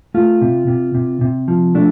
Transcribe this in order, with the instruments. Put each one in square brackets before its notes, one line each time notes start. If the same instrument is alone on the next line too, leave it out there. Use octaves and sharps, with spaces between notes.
[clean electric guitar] A3 F4
C3
C3
C3
C3
F3
A3 D4